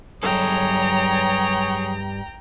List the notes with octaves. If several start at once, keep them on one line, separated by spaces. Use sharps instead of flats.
G2 F#3 G#4 A4 C#5 G5 A#5